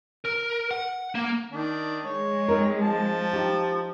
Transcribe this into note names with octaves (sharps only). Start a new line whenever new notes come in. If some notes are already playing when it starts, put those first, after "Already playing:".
A#4
F#5
A#3
D#3 D4
G#3 C#5
C4 D#4 A#4
F3 A5
D#4 G4